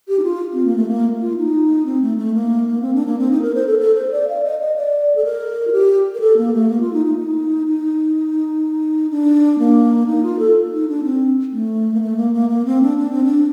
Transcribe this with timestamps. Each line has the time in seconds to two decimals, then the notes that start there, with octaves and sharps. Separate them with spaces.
0.08 G4
0.19 D#4
0.24 F4
0.53 C4
0.65 A#3
0.76 A3
0.88 A#3
1.21 F4
1.37 D#4
1.85 C4
2.02 A3
2.17 A3
2.34 A#3
2.82 C4
2.95 D4
3.06 A#3
3.19 C4
3.31 D#4
3.42 A#4
3.55 C5
3.67 A4
3.79 A4
3.94 C5
4.11 D5
4.28 F5
4.43 D#5
4.60 D#5
4.76 D5
5.16 A4
5.24 A#4
5.67 F4
5.72 G4
6.15 A#4
6.20 A4
6.37 A#3
6.53 A3
6.69 A#3
6.81 F4
6.93 D#4
7.05 D#4
7.17 D#4
7.66 D#4
9.10 D4
9.59 A#3
10.07 D#4
10.23 F4
10.39 A4
10.72 D#4
10.88 D4
11.03 C4
11.53 A3
11.94 A#3
12.01 A3
12.17 A#3
12.34 A#3
12.49 A#3
12.65 C4
12.82 D4
12.98 D4
13.11 C4
13.24 D4